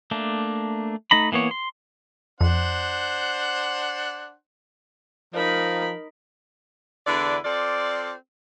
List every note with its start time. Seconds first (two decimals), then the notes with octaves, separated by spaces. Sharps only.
0.11 A3 A#3 D4
1.11 A3 D#4 A#5 B5
1.32 E3 A#3 B3 C#5
1.51 C6
2.41 F2 D4 C5 F#5
5.34 F3 D#4 A#4 B5
7.07 E2 D3 D4 E4 B4 D5
7.45 C4 F4 A4 D5